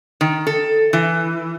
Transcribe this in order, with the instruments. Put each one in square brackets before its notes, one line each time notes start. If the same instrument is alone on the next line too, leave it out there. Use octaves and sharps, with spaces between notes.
[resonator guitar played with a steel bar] D#3
A4
E3